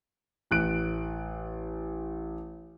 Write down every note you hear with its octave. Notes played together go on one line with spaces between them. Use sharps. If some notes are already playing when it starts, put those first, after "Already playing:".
A1 F#6 D7